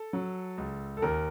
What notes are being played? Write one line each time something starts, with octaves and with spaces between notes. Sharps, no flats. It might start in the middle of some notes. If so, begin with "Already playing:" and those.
Already playing: A4
F#3
C#2
A4
D#2 A#4